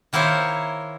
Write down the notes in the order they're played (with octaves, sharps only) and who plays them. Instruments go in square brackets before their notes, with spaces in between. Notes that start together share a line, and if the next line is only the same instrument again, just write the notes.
[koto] D#3 A#3 E4 C5 C#5